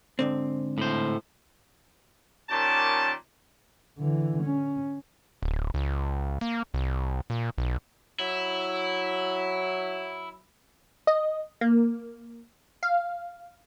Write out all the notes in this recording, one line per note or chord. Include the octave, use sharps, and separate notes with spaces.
G#2 D3 C4
A2 C5
A#2 D#3 C#4 G4 A5
D3 E3
C#4
D1
C#2
A#3
C2
A#2
B1
F#3 E4
D#5
A#3
F5